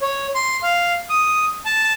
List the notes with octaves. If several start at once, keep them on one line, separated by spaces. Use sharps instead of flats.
C#5
C6
F5
D#6
A5